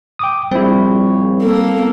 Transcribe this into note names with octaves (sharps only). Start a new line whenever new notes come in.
G5 D6 D#6
A#1 G3 C4 E4 C#5
A#3 A4